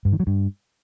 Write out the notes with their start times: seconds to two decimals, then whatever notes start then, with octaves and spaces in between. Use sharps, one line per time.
0.05 G2
0.12 D#3
0.20 F#3
0.27 G2